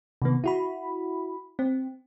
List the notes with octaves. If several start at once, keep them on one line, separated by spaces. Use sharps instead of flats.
C3 D#3 B3
E4 F#4 B5
C4